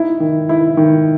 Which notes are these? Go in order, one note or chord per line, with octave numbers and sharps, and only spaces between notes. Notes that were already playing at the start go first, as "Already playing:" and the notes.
Already playing: D#4 E4
D#3
E4
D#3